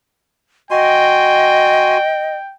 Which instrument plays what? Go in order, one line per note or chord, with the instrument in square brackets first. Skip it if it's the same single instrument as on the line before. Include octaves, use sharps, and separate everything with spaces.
[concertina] F#4 G#5 C6 [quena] D#5 [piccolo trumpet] G5